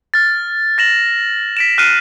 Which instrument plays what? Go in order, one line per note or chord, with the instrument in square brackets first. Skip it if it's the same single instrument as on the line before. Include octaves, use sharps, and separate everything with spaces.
[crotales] F6 A6
A6 A#6 E7 F#7
B6 D7 E7
F6 F#6 C7 D7 D#7